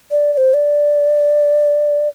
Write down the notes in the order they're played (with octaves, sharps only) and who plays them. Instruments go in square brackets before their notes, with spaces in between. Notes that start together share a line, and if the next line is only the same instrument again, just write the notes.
[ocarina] D5
D5
C5
D5